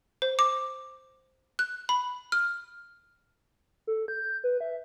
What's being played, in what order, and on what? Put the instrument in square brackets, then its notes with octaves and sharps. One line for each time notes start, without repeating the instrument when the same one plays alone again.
[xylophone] C5
D6
F#6
B5
F6
[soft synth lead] A4
G6
B4
E5